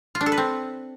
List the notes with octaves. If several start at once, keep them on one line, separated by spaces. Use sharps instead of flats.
F4
D4
A4
B4
C4